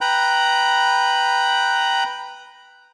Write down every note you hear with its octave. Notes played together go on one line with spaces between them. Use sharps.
B4 G5 A#5 B5